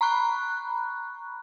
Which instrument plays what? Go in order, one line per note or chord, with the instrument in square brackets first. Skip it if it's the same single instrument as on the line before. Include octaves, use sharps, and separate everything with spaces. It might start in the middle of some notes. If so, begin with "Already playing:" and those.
[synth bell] A#5 B5 C#6 F#6